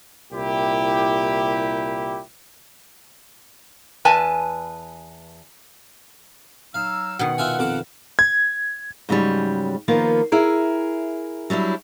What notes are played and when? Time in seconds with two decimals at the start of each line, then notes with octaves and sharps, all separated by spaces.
0.32 C2 A#2 E4 G4
4.05 E2 B4 G#5 A5
6.74 F#3 D#4 F5 E6
7.19 B2 D#3 F#5
7.38 E4 F4 G#5
7.59 F2 F3 D6
8.19 G#6
9.09 G#2 C#3 F#3 G3
9.88 D#3 F3 A#3 B3
10.32 E4 G#4 A#4
11.50 F#3 G3 D4 E4